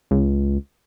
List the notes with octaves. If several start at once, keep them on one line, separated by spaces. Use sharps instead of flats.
C#2